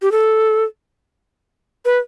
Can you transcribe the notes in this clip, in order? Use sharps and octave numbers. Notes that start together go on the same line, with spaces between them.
G4
A4
B4